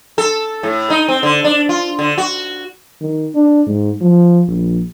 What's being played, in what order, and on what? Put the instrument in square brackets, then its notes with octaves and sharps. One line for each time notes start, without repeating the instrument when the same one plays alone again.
[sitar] A4
A2
D#4
C4
D3
D4
F4
D3
F#4
[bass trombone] D#3
D4
G#2
F3
A#1